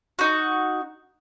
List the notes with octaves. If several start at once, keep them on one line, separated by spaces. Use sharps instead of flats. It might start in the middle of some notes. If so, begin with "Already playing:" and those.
D#4 F#4